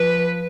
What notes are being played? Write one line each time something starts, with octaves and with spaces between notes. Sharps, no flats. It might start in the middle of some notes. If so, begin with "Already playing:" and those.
Already playing: F3 B4